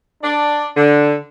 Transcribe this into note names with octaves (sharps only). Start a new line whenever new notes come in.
D4 D5
D3